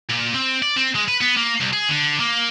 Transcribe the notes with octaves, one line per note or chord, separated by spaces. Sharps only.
A#2
C4
D5
C4
G#3
B4
B3
A#3
C2
G#4
D3
A#3